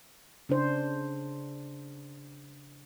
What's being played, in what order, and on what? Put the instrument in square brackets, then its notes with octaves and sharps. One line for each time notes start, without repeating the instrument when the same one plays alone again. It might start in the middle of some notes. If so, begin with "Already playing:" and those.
[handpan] C#3 D4 C5